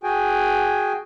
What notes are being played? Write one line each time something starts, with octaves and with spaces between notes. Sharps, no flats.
F#4 G#4 G5 G#5